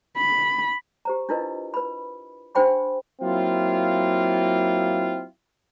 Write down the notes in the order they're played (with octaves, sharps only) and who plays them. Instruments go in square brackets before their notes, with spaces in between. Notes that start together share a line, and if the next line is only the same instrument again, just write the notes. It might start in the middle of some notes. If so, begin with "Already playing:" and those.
[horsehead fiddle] B5
[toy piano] G4 C5 A#5
D4 E4 F4 A#4 B4 D#5
B4 B5
D4 G4 C5 G5 B5 C6
[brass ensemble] F#3 A#3 C4 E4 F4